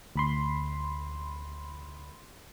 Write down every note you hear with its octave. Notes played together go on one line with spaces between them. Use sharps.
D2 B5 C6